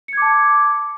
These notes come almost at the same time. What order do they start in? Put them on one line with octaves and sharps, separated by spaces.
C#7 G#6 D6 A5